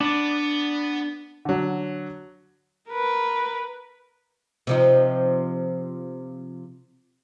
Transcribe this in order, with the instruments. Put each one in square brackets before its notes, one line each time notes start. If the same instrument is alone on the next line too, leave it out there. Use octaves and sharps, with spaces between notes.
[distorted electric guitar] B3 [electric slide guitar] D4 D5
[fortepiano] D3 F#3
[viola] A#4 B4
[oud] C3 F3 D#4